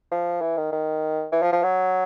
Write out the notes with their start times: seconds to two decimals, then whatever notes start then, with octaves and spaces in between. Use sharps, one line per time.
0.12 F3
0.41 E3
0.57 D#3
0.72 D#3
1.32 E3
1.42 F3
1.52 F3
1.63 F#3